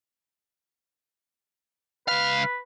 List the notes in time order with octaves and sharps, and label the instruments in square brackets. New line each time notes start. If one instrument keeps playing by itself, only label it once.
[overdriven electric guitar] C#2 F5 [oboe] B4